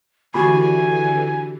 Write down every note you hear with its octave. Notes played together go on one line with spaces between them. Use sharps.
D3 E3 F#4 G4 G#5 B5